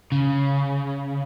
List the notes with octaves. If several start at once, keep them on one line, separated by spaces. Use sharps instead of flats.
C#3